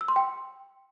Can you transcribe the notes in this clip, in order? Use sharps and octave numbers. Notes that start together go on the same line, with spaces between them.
E6
C6
G5